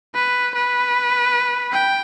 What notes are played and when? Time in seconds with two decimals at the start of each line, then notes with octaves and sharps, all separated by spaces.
0.15 B4
0.55 B4
1.72 G5